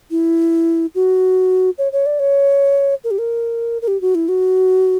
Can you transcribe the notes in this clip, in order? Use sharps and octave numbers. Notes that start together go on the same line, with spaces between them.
E4
F#4
C#5
C#5
D5
C#5
A#4
G4
A#4
A#4
G4
F#4
E4
F#4